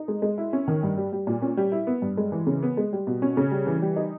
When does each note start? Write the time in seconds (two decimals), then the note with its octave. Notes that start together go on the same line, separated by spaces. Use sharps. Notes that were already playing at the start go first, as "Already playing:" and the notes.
Already playing: D#4
0.08 G#3
0.22 G#3
0.38 E4
0.53 C#4
0.68 D#3
0.83 G2
0.97 G3
1.13 G3
1.27 A#2
1.42 C#4
1.57 G3
1.72 E4
1.87 B3
2.02 G2
2.17 G#3
2.32 E3
2.47 C#3
2.63 B3
2.77 G#3
2.93 G3
3.07 B2
3.22 C#4
3.37 C#3
3.51 G3
3.67 E3
3.82 G3
3.96 D#4